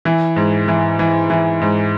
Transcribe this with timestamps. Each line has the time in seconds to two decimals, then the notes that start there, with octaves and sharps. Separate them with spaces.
0.05 E3
0.36 G#2
0.68 E3
0.99 E3
1.30 E3
1.61 G#2